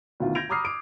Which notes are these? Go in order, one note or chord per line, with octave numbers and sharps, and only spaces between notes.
D2 B2 D#3 F4
G6 G#6 A#6 D7 F7
A#5 B5 D6 D#6 F6 C7
D6 D7